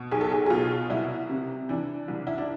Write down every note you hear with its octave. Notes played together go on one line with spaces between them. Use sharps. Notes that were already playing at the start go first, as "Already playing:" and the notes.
Already playing: B2
B1 G#4
A4
G#4
G#4
B2 F4
C2 E4
C3
E3 D4
C2
E4
D4